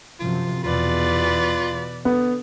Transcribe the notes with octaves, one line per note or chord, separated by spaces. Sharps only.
F#2 C3 F3 F4
E2 B2 E3 F4 B4 D5
D3 B3